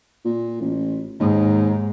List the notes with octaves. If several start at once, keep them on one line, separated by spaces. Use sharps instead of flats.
A#2
A1
D#2 G#2